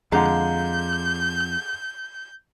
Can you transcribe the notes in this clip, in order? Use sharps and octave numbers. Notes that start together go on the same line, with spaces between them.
F2 D3 G#3 F5 A#5 G6